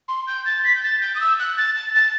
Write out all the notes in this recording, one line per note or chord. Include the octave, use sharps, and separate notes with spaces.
C6
G6
A6
B6
G6
A6
G6
D#6
E6
F#6
A6
A6
A6